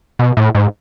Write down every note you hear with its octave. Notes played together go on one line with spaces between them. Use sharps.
B2
A2
G#2